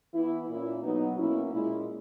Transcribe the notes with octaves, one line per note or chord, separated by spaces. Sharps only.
E3 B3 E4
A#2 A#3 C#4 E4
B2 F#3 B3 D#4
B2 A#3 C#4 E4
A#2 G#3 C#4 E4